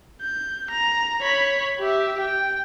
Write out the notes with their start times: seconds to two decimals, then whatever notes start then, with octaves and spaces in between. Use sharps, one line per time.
0.21 G6
0.70 A#5
1.21 C#5 B5
1.79 G4 E5
2.20 G5